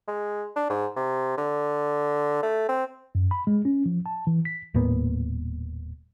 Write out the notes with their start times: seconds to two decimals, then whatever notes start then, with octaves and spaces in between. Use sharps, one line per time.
0.08 G#3
0.56 D4
0.70 G#2
0.96 C3
1.38 D3
2.43 A3
2.69 C4
3.15 F#2
3.31 B5
3.47 G#3
3.65 C#4
3.86 F3
4.06 A5
4.27 E3
4.45 B6
4.74 D#1 A2 A#3 B3